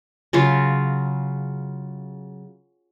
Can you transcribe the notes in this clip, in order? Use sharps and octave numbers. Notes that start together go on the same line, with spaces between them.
C#3 F#3 F4